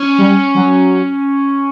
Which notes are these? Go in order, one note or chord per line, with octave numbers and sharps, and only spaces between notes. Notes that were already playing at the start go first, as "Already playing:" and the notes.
Already playing: C#4
G3
F#3